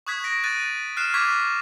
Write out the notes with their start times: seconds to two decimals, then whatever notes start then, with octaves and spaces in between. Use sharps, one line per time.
0.07 C#6 D#6 F#6 G#6 B6
0.24 A#6 D7
0.44 F#6 A6 D#7
0.97 F6 F#6 C7 E7
1.14 C#6 D6 F6 F#6 G#6 B6